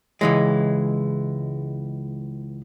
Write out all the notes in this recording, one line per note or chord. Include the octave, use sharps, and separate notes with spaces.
C#2 E3 G#3